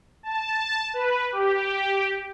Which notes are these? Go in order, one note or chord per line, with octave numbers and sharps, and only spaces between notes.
A5
B4
G4